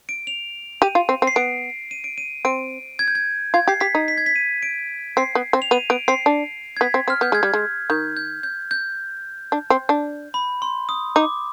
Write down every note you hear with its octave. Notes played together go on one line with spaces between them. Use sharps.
D7
F7
G4 D#7
F4
C4
C4
C7
B3 D7
D#7
D7
D#7
C4 D7
G#6
G6
G#6
F4 G#6
G4 C7
G4 B6
D#4
B6
G#6
B6
D#7
D7
C4 C7
B3
C4
F7
B3 D#7
B3 D7
C4 C7
D4
G#6
B3 B6
C4
C4 F6
B3 G6
G#3 G#6
G3
G#3
D#3 G6
G6
G6
G6
D4
C4
D4
B5
C6
D#6
D#4 D6